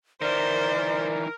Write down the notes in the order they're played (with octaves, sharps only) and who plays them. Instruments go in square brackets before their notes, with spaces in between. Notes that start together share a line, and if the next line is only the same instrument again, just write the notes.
[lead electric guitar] D#3 E3 [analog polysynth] A#4 [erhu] C5 [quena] D5